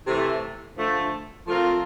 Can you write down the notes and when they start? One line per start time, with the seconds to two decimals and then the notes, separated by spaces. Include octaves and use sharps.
0.06 C3 E3 A3
0.77 D3 F3 A3
1.47 F3 A3 C4 F4 A#4